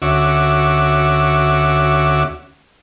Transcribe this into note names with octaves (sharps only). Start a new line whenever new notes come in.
D2 C#4 F#4 E5 D6